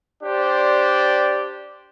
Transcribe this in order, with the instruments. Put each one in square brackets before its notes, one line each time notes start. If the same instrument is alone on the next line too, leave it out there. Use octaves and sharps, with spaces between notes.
[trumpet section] D4 G4 C5 D5